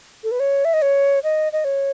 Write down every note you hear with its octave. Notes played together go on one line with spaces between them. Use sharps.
A4
B4
C#5
E5
D#5
C#5
D#5
D#5
C#5